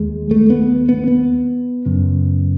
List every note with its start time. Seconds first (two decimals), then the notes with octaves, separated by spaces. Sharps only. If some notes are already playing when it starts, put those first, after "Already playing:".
Already playing: D#2 G#3
0.31 A3
0.50 B3
0.89 B3
1.08 B3
1.86 F#2 C#3